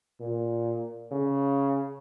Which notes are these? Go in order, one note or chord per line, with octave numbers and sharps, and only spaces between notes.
A#2
C#3